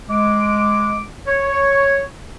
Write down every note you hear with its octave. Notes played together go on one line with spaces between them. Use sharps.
G#3 D6
C#5